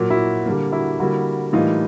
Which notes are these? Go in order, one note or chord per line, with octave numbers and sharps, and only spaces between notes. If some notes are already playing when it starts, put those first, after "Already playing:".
Already playing: A#2 F#3 A#3
E4 F#4
D3 G3 A#3
E4 F#4
D3 G3 A#3 E4 F#4
A2 E3 G3 A#3 D#4 F4